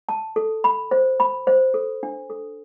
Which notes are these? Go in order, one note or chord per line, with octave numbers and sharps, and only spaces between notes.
A5
A4
B5
C5
B5
C5
A4
D4
A4